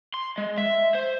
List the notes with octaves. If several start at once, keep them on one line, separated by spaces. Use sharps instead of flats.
C6
G#3
E5
C5